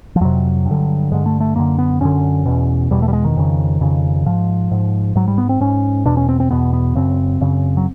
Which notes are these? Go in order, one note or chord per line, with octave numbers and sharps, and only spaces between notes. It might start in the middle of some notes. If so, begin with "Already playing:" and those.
F3
F2 C3 F#3
G2
D3
G2 D3 G#3
A3
A3
F#2 D3 A#3
B3
F#2 D3 C#4
E2 B2
E2 B2 G3
A3
G3
G#3
D#3
F2 C#3
F2 C#3
G#2 F3
G#2
G#2 F#3
G3
B3
C4
G#2 C#4
E2 B2 D4
C#4
C4
C4
E2 B2 B3
B3
F#2 C#3 C4
F#2 C#3
F#3